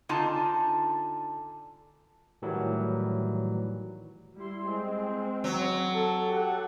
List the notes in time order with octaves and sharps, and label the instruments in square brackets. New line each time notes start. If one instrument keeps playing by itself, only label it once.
[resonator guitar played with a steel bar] D3 D#4 F4 G#5 A5
[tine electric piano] A2 D#3 E3 F#3 G3
[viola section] G3 E4 C6
[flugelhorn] G#3 [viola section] C4
[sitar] F#3
[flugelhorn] A4
[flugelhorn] G4 [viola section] A4 F#5